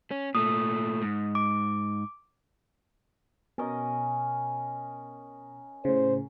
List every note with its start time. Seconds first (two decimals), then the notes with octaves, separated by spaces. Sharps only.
0.11 C#4
0.35 A#2 A3 D#6
1.02 G#2
1.35 D6
3.58 B2 C#4 A#4 D#5
5.85 A2 C#3 C5